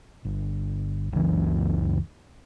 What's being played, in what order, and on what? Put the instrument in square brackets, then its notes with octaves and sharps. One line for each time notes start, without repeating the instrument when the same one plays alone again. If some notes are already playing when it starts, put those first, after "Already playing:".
[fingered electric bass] G1
F#1 C#2 E3